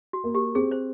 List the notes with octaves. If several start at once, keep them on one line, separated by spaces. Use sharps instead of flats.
F#4
A#3
G4
C4 G#4
C5